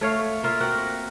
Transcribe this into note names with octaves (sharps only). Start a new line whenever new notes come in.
A3 C#5 F5
A#3 F4 E5
C4 F#4 A#4 F#5